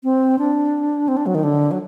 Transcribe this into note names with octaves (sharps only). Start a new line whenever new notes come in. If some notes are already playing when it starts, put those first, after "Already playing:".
C4
D4
C4
D4
F#3
D#3
D3
F#3